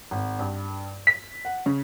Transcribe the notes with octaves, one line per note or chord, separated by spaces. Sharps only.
G#1
G2
B6
F#5
C#3